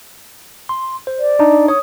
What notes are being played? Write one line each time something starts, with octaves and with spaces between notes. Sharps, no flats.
C6
C5
D5
D4 D#4
C#5 D#6